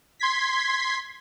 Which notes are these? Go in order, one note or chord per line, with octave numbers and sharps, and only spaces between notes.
C6 G#6 B6